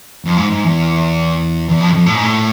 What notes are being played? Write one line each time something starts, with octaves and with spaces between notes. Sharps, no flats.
F2
G#2
G#2
E2
E2
F2
F2
A2
G#2
A2